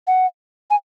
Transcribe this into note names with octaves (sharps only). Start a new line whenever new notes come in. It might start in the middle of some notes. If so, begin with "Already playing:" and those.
F#5
G#5